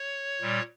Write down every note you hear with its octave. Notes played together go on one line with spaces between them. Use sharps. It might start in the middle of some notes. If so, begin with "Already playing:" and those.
Already playing: C#5
A#2 G3